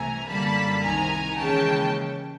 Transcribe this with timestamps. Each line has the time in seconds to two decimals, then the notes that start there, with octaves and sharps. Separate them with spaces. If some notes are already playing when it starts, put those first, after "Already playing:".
Already playing: C2 C3 E3 A3 G#5 A#5
0.27 F#2 D3 G3 A#3 A5 B5
0.82 C2 C3 D#3 G#5 A#5
1.38 D#2 C#3 E3 G#3 C#4 G5 A5